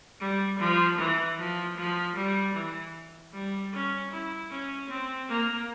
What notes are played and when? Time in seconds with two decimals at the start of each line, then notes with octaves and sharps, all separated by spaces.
0.21 G3
0.60 F3
0.99 E3
1.39 F3
1.78 F3
2.16 G3
2.55 E3
3.34 G3
3.73 C#4
4.11 E4
4.51 C#4
4.90 C4
5.29 A#3